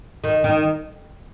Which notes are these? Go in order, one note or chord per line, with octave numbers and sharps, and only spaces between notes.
D#3
D#3